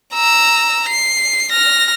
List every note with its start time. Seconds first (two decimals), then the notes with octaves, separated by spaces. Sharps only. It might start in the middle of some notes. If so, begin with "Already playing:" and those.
0.14 A#5 E6
0.88 C7
1.52 F6 A#6